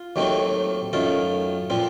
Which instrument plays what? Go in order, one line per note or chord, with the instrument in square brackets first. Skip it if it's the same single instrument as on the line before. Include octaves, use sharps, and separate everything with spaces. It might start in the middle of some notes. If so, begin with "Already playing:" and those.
Already playing: [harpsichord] F4
D#2 D#3 F#3 A3 C4
F#2 D#3 A3 F4
A#2 F3 C4